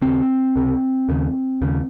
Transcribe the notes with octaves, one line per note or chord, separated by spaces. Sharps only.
D#2 C#3 C4
C#2 C3
D#2 C#3
D#2 C#3